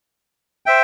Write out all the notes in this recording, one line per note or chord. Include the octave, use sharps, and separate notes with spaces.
C5 E5 G5